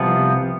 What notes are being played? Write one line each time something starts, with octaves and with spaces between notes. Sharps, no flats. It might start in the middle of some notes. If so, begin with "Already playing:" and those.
Already playing: C2 C3 F3 B3